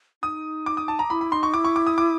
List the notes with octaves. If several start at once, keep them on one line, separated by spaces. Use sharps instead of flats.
D#4 D#6
D6
D#6
A5
A#5
E4 B5
B5
D#4 C6
C#6
E4 D6
C#6
D6
D#6
D6